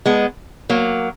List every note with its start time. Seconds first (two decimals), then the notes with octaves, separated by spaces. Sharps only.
0.06 G#3 B3
0.70 F#3 A#3